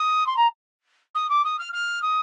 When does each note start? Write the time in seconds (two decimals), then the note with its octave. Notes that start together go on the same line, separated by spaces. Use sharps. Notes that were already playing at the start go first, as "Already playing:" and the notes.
Already playing: D#6
0.26 C6
0.36 A#5
1.15 D#6
1.29 D6
1.44 D#6
1.59 F6
1.73 F6
2.02 D#6